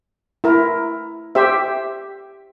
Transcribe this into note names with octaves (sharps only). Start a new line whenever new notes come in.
E4 A#4
G4 C5 E5